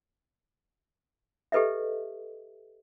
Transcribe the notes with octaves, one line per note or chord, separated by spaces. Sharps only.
G4 A4 B4 D#5 E5